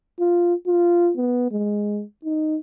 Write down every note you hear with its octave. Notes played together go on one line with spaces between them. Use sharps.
F4
F4
B3
G#3
D#4